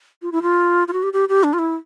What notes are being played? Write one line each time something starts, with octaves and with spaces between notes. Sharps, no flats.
F4
E4
F4
F4
F#4
G4
G4
G4
D4
F4
E4